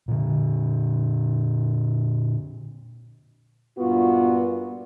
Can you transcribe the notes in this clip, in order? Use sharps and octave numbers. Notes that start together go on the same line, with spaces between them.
A#2 D3
G2 A#2 B3 F4 F#4